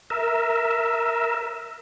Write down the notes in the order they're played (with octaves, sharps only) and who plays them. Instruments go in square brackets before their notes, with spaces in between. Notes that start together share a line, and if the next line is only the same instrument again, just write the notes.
[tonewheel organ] A#4 E5